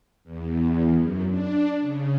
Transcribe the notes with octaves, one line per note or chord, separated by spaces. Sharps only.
E2
F#2
D4
C#3